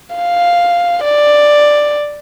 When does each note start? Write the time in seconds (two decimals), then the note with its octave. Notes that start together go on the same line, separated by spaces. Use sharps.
0.16 F5
1.04 D5